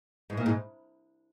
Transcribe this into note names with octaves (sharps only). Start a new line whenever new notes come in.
G#2
A#2
G#2